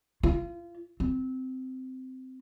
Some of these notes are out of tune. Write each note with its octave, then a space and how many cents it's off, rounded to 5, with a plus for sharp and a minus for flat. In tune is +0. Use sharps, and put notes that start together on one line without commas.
F4 -30
C4 -15